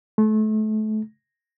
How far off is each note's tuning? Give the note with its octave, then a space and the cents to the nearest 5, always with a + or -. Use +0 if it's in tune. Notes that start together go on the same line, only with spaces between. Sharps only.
A3 -30